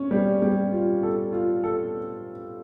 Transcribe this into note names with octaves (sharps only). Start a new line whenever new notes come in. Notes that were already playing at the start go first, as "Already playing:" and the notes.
Already playing: C#4
G3
G3
F4
A4
F4
A4